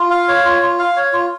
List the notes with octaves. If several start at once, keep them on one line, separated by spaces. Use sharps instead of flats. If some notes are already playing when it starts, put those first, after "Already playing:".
Already playing: F4
F5
C#5
F4
F4
F5
C#5
F4